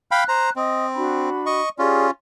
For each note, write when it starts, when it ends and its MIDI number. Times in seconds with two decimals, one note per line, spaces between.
0.11 0.24 77
0.11 0.24 79
0.11 0.24 83
0.11 0.52 90
0.28 0.50 72
0.28 0.50 82
0.56 1.30 60
0.56 0.85 75
0.56 0.85 87
0.95 1.61 62
0.95 1.61 66
0.95 1.61 83
1.46 1.69 75
1.46 1.69 85
1.79 2.11 61
1.79 2.11 65
1.79 2.06 67
1.79 2.06 68
1.79 2.06 74